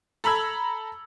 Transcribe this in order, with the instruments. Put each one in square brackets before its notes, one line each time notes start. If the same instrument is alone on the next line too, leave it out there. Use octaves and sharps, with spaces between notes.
[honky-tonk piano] A4 A#5 B5 E6 G#6